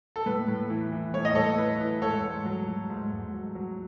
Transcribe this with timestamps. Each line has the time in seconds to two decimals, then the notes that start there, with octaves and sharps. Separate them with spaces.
0.16 A4
0.26 A2 B4
0.48 A2
0.70 E3
0.92 E3
1.14 A2 C#5
1.25 D#5
1.35 A2 A4 C#5
1.58 E3 B4
1.80 E3
2.02 G#2 A4 C#5
2.24 G#2
2.45 F#3
2.67 F#3
2.90 G#2
3.12 G#2
3.34 F#3
3.55 F#3